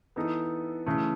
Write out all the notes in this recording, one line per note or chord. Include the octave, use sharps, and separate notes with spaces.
E3 B3 D#4 A4
C#3 E3 A3